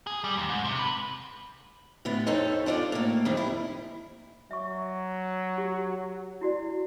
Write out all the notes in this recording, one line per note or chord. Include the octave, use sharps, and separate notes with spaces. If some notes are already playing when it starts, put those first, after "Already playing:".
G#4
G3
D#2
G#2
C3
B4
A2 D3 B3 E4
F2 D#4 A4 C5 C#5
D4 E4 F4 D5
A2 A#3
F2 D#3 G3
E4
F#3 E5 C#6
G4
E4 F#4 D5